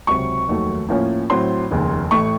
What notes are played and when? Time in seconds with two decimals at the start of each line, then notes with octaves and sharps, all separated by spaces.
0.07 C#2 C3 F#3 C4 C#6
0.48 F1 D#2 D#3 F#3 A3
0.89 A2 F3 A#3 C#4
1.30 A2 F#3 C4 C6
1.71 F1 D#2 C#3
2.11 A1 A2 A3 C#6